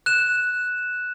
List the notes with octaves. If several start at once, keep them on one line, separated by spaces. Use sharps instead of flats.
F#6 E7